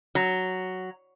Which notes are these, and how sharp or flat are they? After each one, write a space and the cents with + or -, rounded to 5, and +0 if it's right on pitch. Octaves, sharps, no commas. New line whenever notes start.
F#3 +5